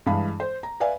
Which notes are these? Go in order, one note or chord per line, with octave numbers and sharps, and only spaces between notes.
G2 E3 G#3 F5 B5
C5
A#5
B4 D5 E5 F5 G#5